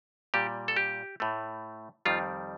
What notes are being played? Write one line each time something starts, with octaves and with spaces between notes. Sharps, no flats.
A#2 G3 G4
A4
G4
A2 A3
F2 D#3 G3 F4